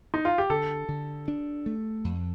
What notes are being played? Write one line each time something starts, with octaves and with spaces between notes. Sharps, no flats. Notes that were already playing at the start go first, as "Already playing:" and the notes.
D#4
F4
G4
D3 A4
D3
D4
A3
F2